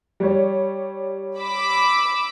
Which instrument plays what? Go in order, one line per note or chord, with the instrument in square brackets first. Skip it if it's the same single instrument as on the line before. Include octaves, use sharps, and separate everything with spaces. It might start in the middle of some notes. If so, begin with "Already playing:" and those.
[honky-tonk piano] G3 C#5
[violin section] B5 D6 E6